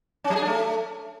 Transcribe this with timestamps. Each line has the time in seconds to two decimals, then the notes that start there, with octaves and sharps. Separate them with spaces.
0.24 C#4
0.30 F#3
0.36 G#4
0.41 D4
0.47 A3